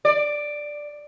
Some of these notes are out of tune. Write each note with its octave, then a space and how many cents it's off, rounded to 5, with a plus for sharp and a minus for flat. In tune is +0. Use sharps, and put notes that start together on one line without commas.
D5 +5